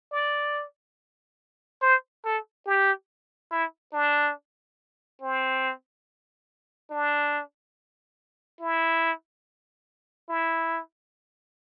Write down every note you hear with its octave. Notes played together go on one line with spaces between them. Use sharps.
D5
C5
A4
G4
E4
D4
C4
D4
E4
E4